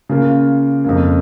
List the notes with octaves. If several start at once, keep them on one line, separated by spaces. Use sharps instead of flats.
C#3 A#3 F4
F2 C#3 A#3